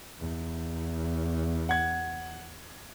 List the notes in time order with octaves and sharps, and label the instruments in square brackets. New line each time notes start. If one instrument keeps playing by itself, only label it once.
[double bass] E2
[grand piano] F#5 G#6